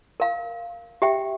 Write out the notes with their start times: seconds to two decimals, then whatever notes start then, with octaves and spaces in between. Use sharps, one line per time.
0.20 A#4 F5
1.02 G4 E5 G5